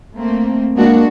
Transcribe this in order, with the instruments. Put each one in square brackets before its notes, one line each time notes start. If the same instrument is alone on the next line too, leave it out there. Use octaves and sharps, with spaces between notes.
[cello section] A3 A#3 C4
[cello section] G#3 D4 F#4 [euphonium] A#3